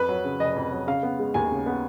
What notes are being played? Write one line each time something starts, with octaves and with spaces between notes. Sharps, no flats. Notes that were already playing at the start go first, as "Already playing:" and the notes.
Already playing: F2 B4
F#3
C#3
F1 D#5
F2
F#3
C#3 F5
B3
G#3
D#2 G#5
C#3
B3